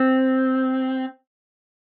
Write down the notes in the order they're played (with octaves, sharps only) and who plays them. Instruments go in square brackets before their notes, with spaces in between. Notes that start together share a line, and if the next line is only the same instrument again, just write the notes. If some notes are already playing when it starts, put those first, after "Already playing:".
Already playing: [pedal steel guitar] C4